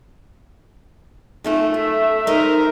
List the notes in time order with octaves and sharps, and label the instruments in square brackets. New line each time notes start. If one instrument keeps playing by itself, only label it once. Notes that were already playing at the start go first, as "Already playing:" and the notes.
[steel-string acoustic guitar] D#3 C#4 F4 [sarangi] A3
[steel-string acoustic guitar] F#2 [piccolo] E5
[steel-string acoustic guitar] D#4 C5 D#5 [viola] A#4